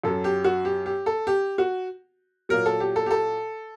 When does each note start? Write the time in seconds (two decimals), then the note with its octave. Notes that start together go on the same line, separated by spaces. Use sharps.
0.04 F#2 F#3 A4
0.24 G4
0.44 F#4
0.65 G4
0.86 G4
1.06 A4
1.27 G4
1.58 F#4
2.49 A#2 F#3 A#4
2.66 A4
2.80 G4
2.96 A4
3.06 G4
3.11 A4